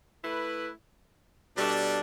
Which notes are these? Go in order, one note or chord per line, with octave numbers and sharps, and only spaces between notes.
A3 E4 B4
B2 G3 D4 A4